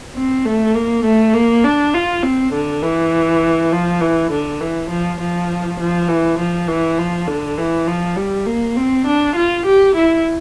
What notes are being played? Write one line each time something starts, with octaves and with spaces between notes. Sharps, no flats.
C4
A3
A#3
A3
A#3
D4
F4
C4
D3
E3
F3
E3
D3
E3
F3
F3
F3
E3
F3
E3
F3
D3
E3
F3
G3
A#3
C4
D4
F4
G4
E4